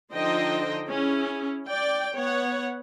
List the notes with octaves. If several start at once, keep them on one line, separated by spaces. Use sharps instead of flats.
D3 F3 D#4 C5 D#5 G5
C#4 E4 G#4
D5 G5
B3 C#5 F#5